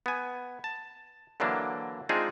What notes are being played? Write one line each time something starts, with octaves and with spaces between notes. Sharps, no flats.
B3 G#5
A5
D3 E3 F#3 A#3 D4
G#3 C4 D4 D#4 F4 G#4